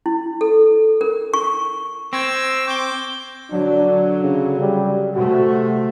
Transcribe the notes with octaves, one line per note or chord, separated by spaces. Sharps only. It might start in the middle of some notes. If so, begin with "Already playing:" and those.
E4
A4
A#4
C#6
C4 C#6 E6 G6 G#6 A#6
D6 G6 G7
D3 F#3 D4
C#3
G3
C3 A3 F#4